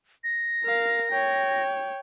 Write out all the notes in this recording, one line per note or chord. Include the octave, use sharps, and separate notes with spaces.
A#6
A#4 F5
C#5 G5